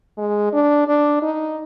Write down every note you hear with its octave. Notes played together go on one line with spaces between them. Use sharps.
G#3
D4
D4
D#4